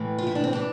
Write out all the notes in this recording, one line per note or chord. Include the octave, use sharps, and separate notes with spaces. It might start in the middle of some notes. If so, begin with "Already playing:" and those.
Already playing: A2 E3
F4
E4
D4
C4
E3 D4